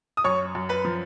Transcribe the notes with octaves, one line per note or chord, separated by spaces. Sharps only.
D#6
F#2 C#5 C#6
F#2
B4 B5
F3